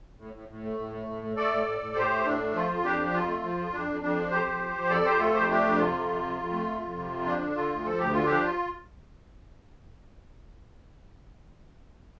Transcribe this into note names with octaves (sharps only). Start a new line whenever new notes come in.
A2
A2
A2
A3
A2
A3
A2
A3
A3 A4 D5
A2
A2
A2
A2 G4 C5
A3
A2 D4
A3
F3 F4
F2
F2 D4 G4
F3
F2 F4
A3
F3
F2
F2 D4
F2
F2 D4
F3
F2 G4 C5
F2
F3
F3
F2 A4 D5
F2 G4 C5
A3 F4 A4
F2 G4 C5
A3 D4 G4
F2
C3 F4
F2
C3
F2
F2
A3
F2
F2
C3
F2
F3 D4
D3
D3 F4
D2
F3 A4
D2 G4
D3 F4
F3 D4 G4
F4